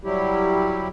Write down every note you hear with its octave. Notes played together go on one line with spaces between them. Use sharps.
F#3 G3 E4 G4